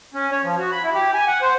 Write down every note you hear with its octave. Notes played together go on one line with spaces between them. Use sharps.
C#4
C#5
F3
F#4
B5
E4
G4
G#5
F#5
C5